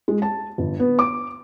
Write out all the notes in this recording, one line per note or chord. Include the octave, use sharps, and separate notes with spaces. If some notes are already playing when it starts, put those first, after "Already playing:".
G#3
A5
G1
B3
D6